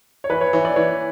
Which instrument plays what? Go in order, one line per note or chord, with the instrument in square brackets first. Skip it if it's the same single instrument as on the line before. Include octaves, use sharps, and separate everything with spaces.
[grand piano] C#5
[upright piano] E3 [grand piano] B4
[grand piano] C#5
[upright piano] E3 [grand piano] C#5
[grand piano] D5
[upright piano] E3 [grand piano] C#5